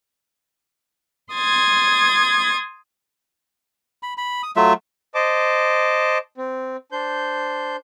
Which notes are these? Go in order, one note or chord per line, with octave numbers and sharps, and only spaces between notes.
C6 D#6 G#6 A6
B5
B5
D#6
F#3 A3 F4 E5
C5 D#5 A5 D6
C4
D4 C5 G6